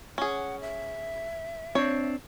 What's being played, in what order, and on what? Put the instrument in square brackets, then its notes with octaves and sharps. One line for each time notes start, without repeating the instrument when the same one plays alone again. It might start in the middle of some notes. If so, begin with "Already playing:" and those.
[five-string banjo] C#4 G#4 [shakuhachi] F#5
[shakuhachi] E5
[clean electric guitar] C4 D4 [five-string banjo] C#5